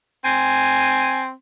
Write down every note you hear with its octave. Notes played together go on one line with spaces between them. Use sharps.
C4 G#5